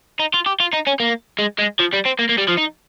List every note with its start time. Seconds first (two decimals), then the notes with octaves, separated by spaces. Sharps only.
0.20 D#4
0.34 F4
0.46 G4
0.60 F4
0.73 D#4
0.87 C#4
1.00 A#3
1.39 G#3
1.58 G#3
1.79 F3
1.93 G3
2.05 C4
2.19 A#3
2.29 A#3
2.38 G3
2.49 F3
2.58 D#4